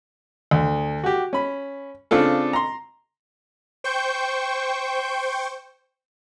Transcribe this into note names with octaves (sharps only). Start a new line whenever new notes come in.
D2
F#4 G4
C#4 B5
C#3 C4 D4 F4 A4
A#5 C6
C5 G5 C#6 G6